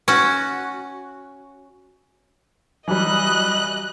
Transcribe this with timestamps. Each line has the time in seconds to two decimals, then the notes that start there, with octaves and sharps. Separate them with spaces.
0.08 C#4 F#4
2.88 E3 F#3 G3 D#5 F#6